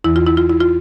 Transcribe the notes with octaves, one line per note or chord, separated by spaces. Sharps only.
E2 E3 E4
F4
E4
F4
E4
F4